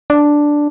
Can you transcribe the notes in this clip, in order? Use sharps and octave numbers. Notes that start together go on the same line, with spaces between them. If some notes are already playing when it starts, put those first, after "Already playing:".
D4